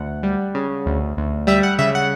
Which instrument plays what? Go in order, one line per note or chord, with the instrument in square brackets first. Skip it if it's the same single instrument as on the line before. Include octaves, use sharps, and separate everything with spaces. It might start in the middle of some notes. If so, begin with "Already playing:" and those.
Already playing: [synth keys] D2 F#5
G3
C#3
D2
D2
G3 E5
F#5
C#3 E5
F#5